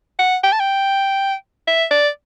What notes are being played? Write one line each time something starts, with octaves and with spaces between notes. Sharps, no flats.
F#5
G5
A5
G5
E5
D5